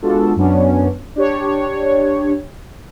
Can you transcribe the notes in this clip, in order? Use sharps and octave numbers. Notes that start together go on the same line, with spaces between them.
G#3 B3 D4 F4 F#4 A4
F#2 F#3 B3 C#4 D4
D4 G4 C#5